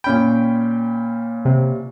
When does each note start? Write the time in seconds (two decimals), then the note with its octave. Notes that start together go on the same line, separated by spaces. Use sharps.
0.04 A#2 C#4 G5 B5
1.45 C3